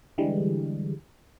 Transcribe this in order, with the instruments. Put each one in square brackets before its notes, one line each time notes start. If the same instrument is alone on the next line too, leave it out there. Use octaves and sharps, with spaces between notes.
[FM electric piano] D3 E3 G3 G#3